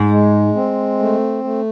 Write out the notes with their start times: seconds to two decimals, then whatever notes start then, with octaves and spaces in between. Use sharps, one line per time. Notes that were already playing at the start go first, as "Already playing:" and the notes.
Already playing: G#2
0.11 G#3
0.55 C4
0.99 A3
1.44 A3